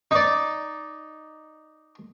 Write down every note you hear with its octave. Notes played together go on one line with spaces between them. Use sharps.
D#4 D5